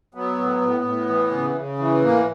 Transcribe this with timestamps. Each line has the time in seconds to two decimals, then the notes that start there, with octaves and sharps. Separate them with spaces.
0.14 F#3 B3
0.38 A2
0.61 A2
0.84 A2
1.09 E3
1.31 C#3
1.55 C#3
1.79 E3
2.02 A2 A#3